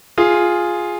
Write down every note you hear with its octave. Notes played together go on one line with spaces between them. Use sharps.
F4 G#4